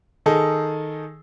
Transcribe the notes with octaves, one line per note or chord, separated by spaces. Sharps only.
D#3 D#4 G#4 A4